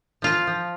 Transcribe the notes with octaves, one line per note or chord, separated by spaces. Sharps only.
F3 F4 F5
F3